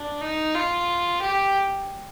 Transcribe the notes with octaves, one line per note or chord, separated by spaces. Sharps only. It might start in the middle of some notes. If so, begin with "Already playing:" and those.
Already playing: D4
D#4
F4
G4